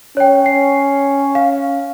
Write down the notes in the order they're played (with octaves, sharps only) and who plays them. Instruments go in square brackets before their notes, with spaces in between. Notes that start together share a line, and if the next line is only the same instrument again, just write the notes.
[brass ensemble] C#4 [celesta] C#5 G5
[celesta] C7
F5